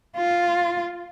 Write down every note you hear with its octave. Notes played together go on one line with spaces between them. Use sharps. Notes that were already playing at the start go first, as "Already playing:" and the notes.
F4